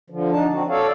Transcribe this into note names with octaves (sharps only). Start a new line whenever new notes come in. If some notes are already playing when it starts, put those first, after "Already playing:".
D3 F3
D4 D#4 A5
C4 F#4
A4 C#5 D5 F5